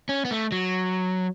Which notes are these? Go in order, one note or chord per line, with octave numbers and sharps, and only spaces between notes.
C#4
B3
A3
F#3